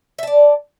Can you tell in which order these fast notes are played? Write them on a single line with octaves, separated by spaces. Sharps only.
E5 A5 D5